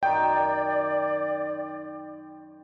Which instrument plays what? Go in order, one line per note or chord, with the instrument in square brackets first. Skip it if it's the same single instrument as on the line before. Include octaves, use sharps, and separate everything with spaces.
[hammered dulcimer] F#2 D#3 [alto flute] D5 [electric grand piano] G5